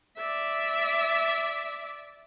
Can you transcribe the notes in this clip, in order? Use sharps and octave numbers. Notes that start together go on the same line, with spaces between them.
D5 E5